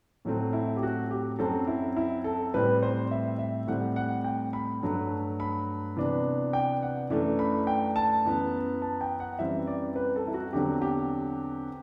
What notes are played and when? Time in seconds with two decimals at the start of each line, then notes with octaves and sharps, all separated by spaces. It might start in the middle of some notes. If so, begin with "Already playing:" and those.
0.25 A2 F#3 A3 C4
0.53 E4
0.77 G4
0.83 F#4
1.11 G4
1.39 F#2 F#3 C4 A4
1.67 E4
1.97 E4
2.24 A4
2.54 A2 G3 C4 B4
2.83 C5
3.11 E5
3.39 E5
3.67 A2 G3 C4 F#5
3.96 F#5
4.24 G5
4.53 B5
4.82 G2 F#3 A3
5.40 B5
5.97 C3 E3 B3 D4
6.53 G5
6.82 F#5
7.10 F#2 E3 A3 D4
7.39 B5
7.67 G5
7.96 A5
8.25 F#2 E3 B3
8.82 A5
9.01 G5
9.20 F#5
9.39 F#2 E3 G3 C4 E5
9.67 D5
9.96 B4
10.16 A4
10.27 E4
10.34 F#4
10.53 E2 D3 F#3 C4 G4
10.82 G4